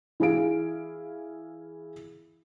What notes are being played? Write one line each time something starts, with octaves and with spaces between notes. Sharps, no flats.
E3 E4 G#4 F5 D7